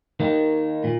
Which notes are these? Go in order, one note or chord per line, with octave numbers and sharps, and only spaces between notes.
D#3 A#3 D#4
A#2